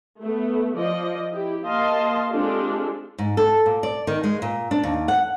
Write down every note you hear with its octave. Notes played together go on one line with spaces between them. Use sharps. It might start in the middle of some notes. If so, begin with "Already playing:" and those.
A3 B3
F3 D5 D#5
E4 G4
A#3 D#5 F5 A5 C6
G#3 C4 D4 F4 G4 A4
G#2
A4
A#2
D5
D#3
G#3
A#2
D4
D#2
F#5